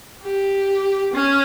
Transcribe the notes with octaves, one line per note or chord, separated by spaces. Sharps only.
G4
C#4